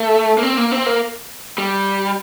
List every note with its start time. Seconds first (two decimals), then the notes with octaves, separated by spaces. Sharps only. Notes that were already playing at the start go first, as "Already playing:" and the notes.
Already playing: A3
0.38 A#3
0.43 C4
0.57 A#3
0.72 C4
0.86 A#3
1.58 G3